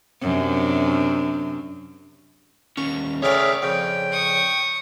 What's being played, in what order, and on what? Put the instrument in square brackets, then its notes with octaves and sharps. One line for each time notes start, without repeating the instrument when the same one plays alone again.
[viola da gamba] F#2 C3 D4
[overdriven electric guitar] D#2 C#4 [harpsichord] C#6
[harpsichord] A2 C#3 A#4 [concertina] C#4 G#4 E5 [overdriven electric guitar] C#5 D5
[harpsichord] F2 C#3 [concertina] G5
[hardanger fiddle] C#6 D#6